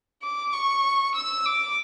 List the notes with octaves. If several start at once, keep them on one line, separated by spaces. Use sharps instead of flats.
D6
C#6
E6
D6